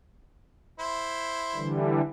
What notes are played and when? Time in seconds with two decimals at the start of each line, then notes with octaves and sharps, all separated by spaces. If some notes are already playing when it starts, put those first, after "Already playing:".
0.79 E4 C5
1.55 D3 E3 G3